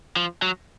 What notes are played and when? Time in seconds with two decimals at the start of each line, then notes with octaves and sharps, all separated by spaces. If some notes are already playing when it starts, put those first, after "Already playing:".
0.16 F3
0.42 F#3